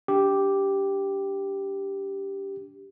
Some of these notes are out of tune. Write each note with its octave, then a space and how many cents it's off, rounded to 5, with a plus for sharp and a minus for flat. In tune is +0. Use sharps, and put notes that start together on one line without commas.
D4 -25 G4 +0